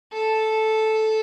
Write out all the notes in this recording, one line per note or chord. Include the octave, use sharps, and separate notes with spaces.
A4